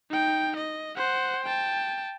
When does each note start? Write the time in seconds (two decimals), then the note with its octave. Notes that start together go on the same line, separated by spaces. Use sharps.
0.10 D#4 G5
0.57 D#5
0.96 C5 F#5
1.45 G5 A5